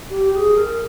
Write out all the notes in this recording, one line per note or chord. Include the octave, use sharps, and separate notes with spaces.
G4
G#4
A#4